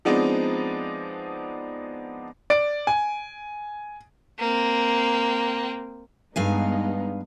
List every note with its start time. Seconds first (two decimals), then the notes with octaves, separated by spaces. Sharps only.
0.05 F3 G#3 B3 C4 D4 D#4
2.50 D5 D7
2.87 G#5
4.39 A#3 C4
6.36 G2 G#3 B3 D#4 F5 G#5